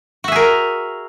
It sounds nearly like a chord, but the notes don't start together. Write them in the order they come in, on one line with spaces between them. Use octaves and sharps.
F#4 E5 G#4 A#4